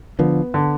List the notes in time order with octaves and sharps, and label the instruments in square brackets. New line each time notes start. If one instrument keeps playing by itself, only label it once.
[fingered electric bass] D3 F3 [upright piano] B3
[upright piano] D3